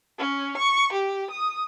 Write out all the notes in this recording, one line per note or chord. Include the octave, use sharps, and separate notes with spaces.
C#4
C#6
G4
D#6